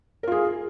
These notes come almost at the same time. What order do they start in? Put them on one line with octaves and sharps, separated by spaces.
A#4 F4 G#4